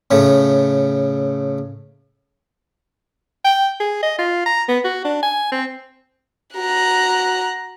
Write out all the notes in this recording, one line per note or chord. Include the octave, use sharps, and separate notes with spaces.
A2 C#3 A3
G5
G#4
D#5
F4
A#5
B3
F#4
D4
G#5
C4
F#4 A#5 F#6